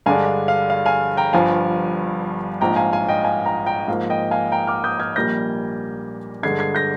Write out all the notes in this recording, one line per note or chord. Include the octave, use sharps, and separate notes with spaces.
G2 D3 G#3 D4 F5 G#5
F5
F5
F5
F5 G#5
G5 A#5
G1 G2 F3 F5 G#5
A#1 G#2 F3 G5 A#5
F5 G#5
F5 G#5
D#5 G5
F5 G#5
G5 A#5
G5 A#5
G#2 F3 A#3 F5
D#5 G5
F5 G#5
G5 A#5
D6 F6
D#6 G6
F6 G#6
A#1 A#2 G3 A#3 G6 A#6
G2 D3 G#3 D4 G#6 C7
G#6 C7
G6 A#6